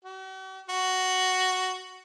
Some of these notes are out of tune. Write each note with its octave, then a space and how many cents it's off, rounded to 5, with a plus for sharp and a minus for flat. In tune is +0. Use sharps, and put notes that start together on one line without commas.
F#4 +45
F#4 +5